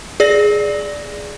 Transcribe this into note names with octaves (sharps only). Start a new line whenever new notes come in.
G#4 D5 A#6